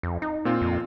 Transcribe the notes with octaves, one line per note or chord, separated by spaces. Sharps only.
F2
D#4
A#2 C4 F4
F2